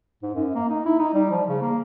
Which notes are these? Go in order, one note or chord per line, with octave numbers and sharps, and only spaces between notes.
G#2
F#2
A#3
D#4
E4
D#4
G3
F3
C#3
A#3